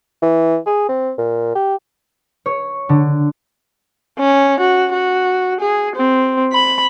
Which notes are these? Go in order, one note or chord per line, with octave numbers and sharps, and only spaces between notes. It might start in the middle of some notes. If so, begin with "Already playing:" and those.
E3
G#4
C4
A#2
G4
C#5
D3
C#4
F#4
F#4
G#4
C4
B5